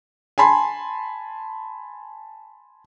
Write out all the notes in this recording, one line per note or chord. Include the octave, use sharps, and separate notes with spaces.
G#5 A5 B5 C6